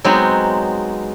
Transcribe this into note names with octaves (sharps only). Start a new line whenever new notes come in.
F#3 G#3 B3 C4 D#4